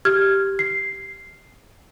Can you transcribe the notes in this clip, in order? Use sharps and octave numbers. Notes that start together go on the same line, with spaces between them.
G4 F6 G#6
C7